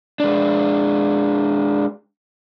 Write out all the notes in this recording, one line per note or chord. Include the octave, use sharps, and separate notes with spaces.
G#3 D4